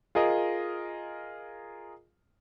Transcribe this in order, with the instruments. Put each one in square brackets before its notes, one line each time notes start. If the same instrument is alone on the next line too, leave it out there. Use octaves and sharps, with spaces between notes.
[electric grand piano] F4 G#4 A#4 D#5